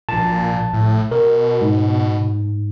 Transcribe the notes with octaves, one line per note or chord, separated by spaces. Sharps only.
A#1 A#2 A5
A2
B2 A#4
G#2